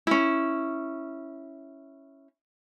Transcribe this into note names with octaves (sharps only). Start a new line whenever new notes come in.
C#4 E4